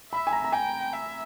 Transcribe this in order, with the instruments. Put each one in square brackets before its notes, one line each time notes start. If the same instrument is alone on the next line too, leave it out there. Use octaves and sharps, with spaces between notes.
[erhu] E5 [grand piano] B5
[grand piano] G#5
A#5
A#5
[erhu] G5 [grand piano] G#5
[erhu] E5